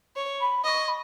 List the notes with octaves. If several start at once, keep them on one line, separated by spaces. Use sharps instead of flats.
C#5
B5
D#5 C#6 D#6
B5